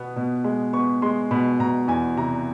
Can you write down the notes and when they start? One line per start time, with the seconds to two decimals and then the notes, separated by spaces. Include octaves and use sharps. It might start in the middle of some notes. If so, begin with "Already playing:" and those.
Already playing: B2 B3
0.16 B2
0.44 G#3
0.73 B3 C#6
1.02 G#3 C6
1.31 B2 B5
1.59 B2 A#5
1.88 E2 G#5
2.17 C3 A#5